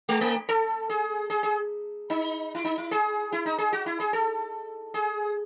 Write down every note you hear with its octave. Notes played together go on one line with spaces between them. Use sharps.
G#3
A3
A4
G#4
G#4
G#4
D#4
E4
D#4
E4
G#4
E4
D#4
G#4
F#4
E4
G#4
A4
G#4